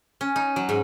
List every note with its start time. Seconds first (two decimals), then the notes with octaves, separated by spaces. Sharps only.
0.21 C#4
0.36 D#4
0.56 F#3
0.69 G#2